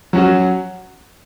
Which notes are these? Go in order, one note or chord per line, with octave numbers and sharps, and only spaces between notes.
F#3 C#4 F#4